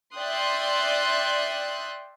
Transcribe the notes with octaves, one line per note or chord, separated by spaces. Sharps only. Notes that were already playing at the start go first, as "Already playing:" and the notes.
D5 E5 G5 C6 D#6 F#6